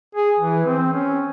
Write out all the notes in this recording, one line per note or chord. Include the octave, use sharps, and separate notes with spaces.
G#4
E3
C4
C#4